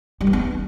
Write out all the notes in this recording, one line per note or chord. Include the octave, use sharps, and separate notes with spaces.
G3
E3
B3